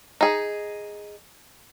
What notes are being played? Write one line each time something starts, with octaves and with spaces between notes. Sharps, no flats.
D#4 G#4